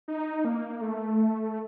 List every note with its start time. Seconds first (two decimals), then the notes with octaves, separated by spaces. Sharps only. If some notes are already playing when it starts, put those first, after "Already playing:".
0.08 D#4
0.45 A#3
0.81 A3